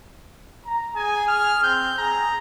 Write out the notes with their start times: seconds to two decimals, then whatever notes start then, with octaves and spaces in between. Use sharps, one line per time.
0.66 A#5
0.96 G#4 G#5
1.28 F6
1.63 C4 G6
1.98 G#4 A#5